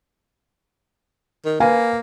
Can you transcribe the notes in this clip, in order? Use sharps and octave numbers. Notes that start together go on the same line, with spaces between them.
D#3
A#3 B4 F5 G#5